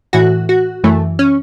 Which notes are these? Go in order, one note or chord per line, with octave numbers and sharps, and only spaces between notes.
A2 E3 F#4
F#4
F#2 E3 A3
C#4